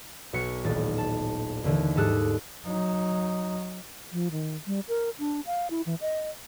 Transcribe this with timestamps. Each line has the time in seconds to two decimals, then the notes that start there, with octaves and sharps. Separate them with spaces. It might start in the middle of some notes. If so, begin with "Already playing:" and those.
0.33 B1 B2 B3 C#6 C#7
0.64 D#1 A1 A6
0.98 A5
1.64 D#2 D3 E3
1.96 G#2 G3 A4 D#6 F#6
2.66 F#3 D#4
4.12 F3
4.31 D#3
4.67 G3
4.88 A#4
5.19 D4
5.46 F5
5.70 E4
5.86 E3
6.01 D#5